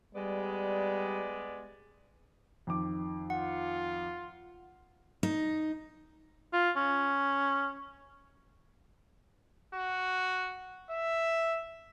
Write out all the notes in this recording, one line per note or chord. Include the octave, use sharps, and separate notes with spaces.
G3 G#3 B3 D5
F2 D#3 D6
F4 F#5
D#4
F4
C#4
F#4
E5